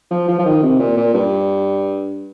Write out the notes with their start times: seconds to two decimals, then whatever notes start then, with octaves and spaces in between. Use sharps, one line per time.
0.11 F3
0.28 F3
0.39 F3
0.46 D#3
0.63 C3
0.79 A#2
0.97 A#2
1.14 G2